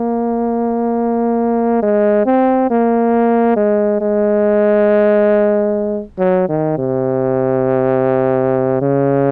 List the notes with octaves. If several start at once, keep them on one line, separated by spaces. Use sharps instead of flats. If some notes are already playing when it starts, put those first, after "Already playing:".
Already playing: A#3
G#3
C4
A#3
G#3
G#3
F#3
D#3
C3
C#3